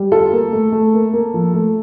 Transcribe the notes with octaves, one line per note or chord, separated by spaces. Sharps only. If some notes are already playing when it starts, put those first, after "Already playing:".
Already playing: G3
F4 A4
A#3
A3
A3
A#3
A#3
F3
A3